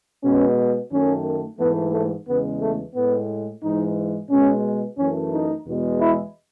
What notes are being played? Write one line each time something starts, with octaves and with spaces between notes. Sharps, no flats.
B2 G#3 C#4
F#2 D#3 A3 C#4
G#2 E3 A3 B3
A3
E2 C#3 G#3 B3
A3
A2 G#3 B3
G#2 E3 G#3 D#4
B2 G#3 C#4
F#2 E3 A3 C#4
D#4
E2 B2 G#3
E4